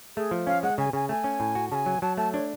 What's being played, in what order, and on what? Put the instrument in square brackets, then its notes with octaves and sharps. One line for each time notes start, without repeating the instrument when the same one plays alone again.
[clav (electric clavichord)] A3 [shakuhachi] G#4
[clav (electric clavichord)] F3
[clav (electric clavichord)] C#4 [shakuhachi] F5
[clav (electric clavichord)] G#3 [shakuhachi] F#5
[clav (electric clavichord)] C#3 [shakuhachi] G#5
[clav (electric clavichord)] C#3 [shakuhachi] G#5
[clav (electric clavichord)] A3 [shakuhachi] G#5
[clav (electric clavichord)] C#4
A2
F#4
[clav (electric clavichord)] C#3 [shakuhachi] G#5 A5
[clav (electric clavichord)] F#3
[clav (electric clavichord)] F#3 [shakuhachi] A5
[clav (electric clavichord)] A3 [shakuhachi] A5
[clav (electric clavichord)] D4 [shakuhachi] C#5